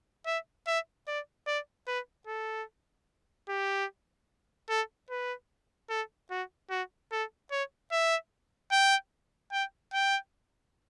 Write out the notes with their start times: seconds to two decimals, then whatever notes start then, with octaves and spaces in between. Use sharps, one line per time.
0.26 E5
0.67 E5
1.08 D5
1.47 D5
1.87 B4
2.27 A4
3.49 G4
4.69 A4
5.10 B4
5.90 A4
6.31 F#4
6.70 F#4
7.12 A4
7.51 C#5
7.92 E5
8.71 G5
9.52 G5
9.93 G5